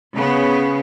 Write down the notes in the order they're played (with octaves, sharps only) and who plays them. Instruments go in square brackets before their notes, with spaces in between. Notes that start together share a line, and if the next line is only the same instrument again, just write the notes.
[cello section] C#3 B3